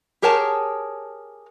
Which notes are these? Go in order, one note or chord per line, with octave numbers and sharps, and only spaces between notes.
G4 G#4 A#4 C#5 G5 A5